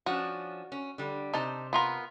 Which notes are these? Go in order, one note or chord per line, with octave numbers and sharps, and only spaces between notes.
F3 C#4 D4 F#4
C#4
D3 G3
C3 D#4 C5 A5
B3 F4 A#4